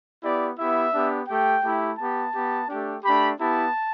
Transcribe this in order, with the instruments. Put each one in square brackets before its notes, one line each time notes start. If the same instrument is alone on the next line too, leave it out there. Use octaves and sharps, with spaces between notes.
[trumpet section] B3 E4 G4 D5
B3 E4 G4 E5
B3 D4 G4
A3 G4 G5
A3 E4 G4
B3 G4 A5
B3 G4
A3 D4 G4
A3 D4 G4 B5
B3 E4 G4 A5